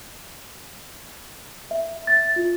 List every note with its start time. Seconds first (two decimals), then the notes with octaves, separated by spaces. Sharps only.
1.71 E5
2.07 A6
2.36 F4